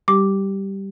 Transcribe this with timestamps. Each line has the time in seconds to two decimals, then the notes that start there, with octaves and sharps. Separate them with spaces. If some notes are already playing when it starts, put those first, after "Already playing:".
0.08 G3 G4 D6